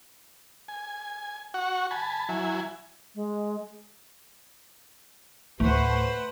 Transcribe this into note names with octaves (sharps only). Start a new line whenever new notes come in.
G#5
F#4 F#5 C#6
G#5 A5 B5
F#3 E4 G#5
G#3
D2 A2 A3 B4 C5 F#5